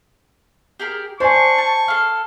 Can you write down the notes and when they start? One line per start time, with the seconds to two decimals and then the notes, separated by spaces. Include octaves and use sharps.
0.80 G4 G#4 A#4
1.20 D4 C5 G#5 C#6
1.58 A5
1.88 A4 F5